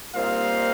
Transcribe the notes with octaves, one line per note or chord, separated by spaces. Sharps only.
A#2 G3 C4 D#4 F5